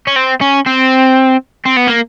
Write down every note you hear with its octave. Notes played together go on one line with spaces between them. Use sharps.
C#4
C4
C#4
C4
C4
B3
A#3